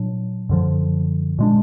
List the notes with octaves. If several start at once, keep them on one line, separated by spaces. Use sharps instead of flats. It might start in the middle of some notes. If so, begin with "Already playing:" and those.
Already playing: A#2 F#3 D4
F#2 D3 F3
A#2 G#3 D4